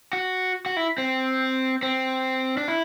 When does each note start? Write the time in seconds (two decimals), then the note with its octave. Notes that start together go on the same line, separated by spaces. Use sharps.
0.13 F#4
0.66 F#4
0.77 E4
0.98 C4
1.83 C4
2.57 D4
2.68 E4